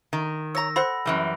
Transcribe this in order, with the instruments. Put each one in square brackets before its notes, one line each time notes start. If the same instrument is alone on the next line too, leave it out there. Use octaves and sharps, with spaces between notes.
[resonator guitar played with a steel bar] D#3
[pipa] C#5 A#5 [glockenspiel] E6 A#6
[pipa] A4 C5 F#5 [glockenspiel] B5
[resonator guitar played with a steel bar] F#2 E3 G3